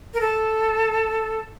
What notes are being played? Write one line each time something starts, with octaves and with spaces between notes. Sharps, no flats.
A#4
A4